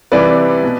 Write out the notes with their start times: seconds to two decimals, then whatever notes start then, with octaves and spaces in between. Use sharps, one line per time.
0.12 C3 E3 G3 B4 D5
0.63 B2